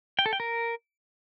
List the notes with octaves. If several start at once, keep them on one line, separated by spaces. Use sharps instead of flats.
G5
A4
G5
A#4